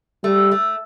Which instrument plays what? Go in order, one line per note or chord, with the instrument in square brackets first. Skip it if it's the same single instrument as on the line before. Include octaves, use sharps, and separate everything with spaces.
[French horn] G3 [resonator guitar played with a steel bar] A3
[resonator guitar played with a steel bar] A3